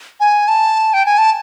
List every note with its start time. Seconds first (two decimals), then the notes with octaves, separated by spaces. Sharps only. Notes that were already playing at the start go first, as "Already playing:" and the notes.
0.20 G#5
0.48 A5
0.93 G5
1.06 G#5
1.18 A5